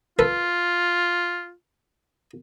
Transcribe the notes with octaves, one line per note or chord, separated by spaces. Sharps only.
F4 A4 B4